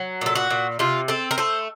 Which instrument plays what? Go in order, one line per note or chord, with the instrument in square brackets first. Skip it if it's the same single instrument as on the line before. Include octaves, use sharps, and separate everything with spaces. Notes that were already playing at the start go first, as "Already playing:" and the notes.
Already playing: [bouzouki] F#3
A#2 A4
F#4
A#2
C3 F4
C4 A4
A#4
A3 C5